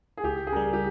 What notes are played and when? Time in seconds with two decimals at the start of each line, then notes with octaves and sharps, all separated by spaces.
0.17 G#4
0.24 C#2 G4
0.47 G#4
0.52 C#3 G3 A#4
0.73 G4